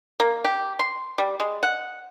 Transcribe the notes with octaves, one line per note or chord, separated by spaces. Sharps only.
A#3
G4
C6
G3
G#3
F#5